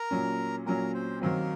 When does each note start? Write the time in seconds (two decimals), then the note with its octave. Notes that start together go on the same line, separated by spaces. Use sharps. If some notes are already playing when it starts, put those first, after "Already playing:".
Already playing: A#4 A#5
0.11 A#2 F#3 C#4
0.66 A#2 F#3 C#4 A#4 A#5
0.94 C4 C5
1.21 D#3 F#3 A#3 C4 A#4